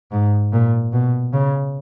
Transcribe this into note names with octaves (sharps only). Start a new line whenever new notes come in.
G#2
A#2
B2
C#3